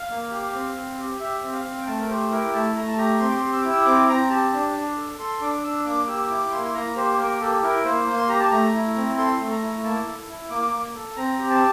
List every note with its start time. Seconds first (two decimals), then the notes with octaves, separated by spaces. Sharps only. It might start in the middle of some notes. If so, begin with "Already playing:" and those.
Already playing: F5
0.10 A#3
0.31 G4
0.53 C4
0.76 C4
0.98 G4
1.20 G4 E5
1.42 C4
1.53 F5
1.64 C4
1.81 G5
1.86 A3 A5
2.00 A#4
2.09 G4 C5
2.31 E4 A#4
2.53 A3 A5
2.75 A3 A#5
2.87 A5
2.97 G4 A#5
3.19 C4 C6
3.28 D6
3.37 G4 C6
3.53 E6
3.61 E4 D6
3.69 E6
3.86 C4 D6
4.08 C4 A#5
4.30 G4 A5
4.53 D4
4.74 D4
4.97 A4
5.19 A4 C6
5.41 D4 D6
5.63 D4 E6
5.85 A#3 D6
6.08 G4 E6
6.29 E4 D6
6.52 A#3 C6
6.65 C6
6.74 A#3 A#5
6.96 G4 C5
7.18 A#3 A#4
7.40 G4 A4
7.62 E4 A#4
7.85 A#3 C5
8.07 A#3
8.17 C6
8.29 G4 A#5
8.39 A5
8.51 A3 A#5
8.74 E4
8.96 C4
9.17 A4 C6
9.39 A3
9.51 A#5
9.62 E4
9.84 A#3 A5
10.06 A4
10.28 E4
10.50 A#3 D6
10.73 A#3
10.95 A4
11.17 C4 A#5
11.38 G4
11.50 A5